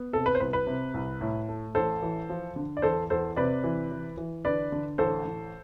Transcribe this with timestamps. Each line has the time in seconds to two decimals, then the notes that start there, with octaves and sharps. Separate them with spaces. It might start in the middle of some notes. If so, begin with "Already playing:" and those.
Already playing: B3
0.13 C3 A4
0.26 B4
0.35 C5
0.40 C2 B4
0.53 B4
0.67 C3
0.94 C2
1.21 A2
1.48 A3
1.75 A1 A4 C5
2.02 E3
2.29 F3
2.56 D3
2.77 D5
2.82 E2 A4 C5
3.10 E2 A4 C5
3.36 C3 B4 D5
3.64 E3
3.91 E3
4.17 E3
4.45 D3 B4 D5
4.72 D3
4.98 A1 A4 C5
5.25 A1